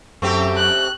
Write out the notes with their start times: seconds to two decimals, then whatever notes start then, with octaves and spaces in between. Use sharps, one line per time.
0.22 F#2 A3 C4 G4
0.57 F#6